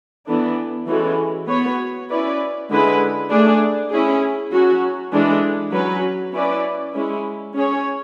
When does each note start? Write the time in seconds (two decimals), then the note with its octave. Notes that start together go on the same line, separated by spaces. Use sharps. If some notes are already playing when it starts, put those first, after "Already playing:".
0.27 E3 B3 D4 A4
0.88 E3 G#3 C#4 F#4 A4
1.49 B3 F#4 C#5
2.09 C#4 E4 B4 D5
2.70 D3 G#3 C#4 E4 B4
3.31 A3 D4 G#4 D5
3.91 C#4 E4 G#4
4.52 F#3 C#4 F#4
5.13 E3 G#3 D4 A4
5.73 F#3 C#4 F#4 B4
6.34 C#4 E4 B4 D5
6.94 G#3 C#4 E4
7.55 C#4 G#4 C#5